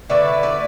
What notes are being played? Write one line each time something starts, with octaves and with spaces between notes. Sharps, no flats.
D3 A3 E4 B4 D5
B4 D5